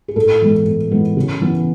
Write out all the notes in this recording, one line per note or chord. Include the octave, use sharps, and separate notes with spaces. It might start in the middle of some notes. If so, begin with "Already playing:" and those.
G#4
A2 A4
E3 G#3 B3
A2
E3 G#3 B3
C#3
E3 B3